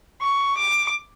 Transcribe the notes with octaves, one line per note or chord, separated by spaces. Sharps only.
C#6
D6